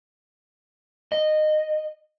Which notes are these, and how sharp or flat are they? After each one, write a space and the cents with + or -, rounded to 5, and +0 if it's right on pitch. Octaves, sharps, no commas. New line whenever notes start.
D#5 -15